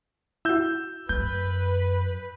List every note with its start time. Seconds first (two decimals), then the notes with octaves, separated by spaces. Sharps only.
0.45 E4 F#4 E6 G6
1.09 F#2 B4 G6